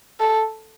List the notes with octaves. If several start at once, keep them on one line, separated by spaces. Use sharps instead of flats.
A4